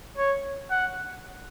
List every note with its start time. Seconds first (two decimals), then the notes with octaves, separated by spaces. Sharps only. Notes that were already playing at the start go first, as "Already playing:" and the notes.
0.17 C#5
0.70 F#5